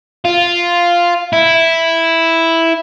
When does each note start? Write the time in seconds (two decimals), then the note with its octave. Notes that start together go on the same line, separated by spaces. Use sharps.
0.25 F4
1.33 E4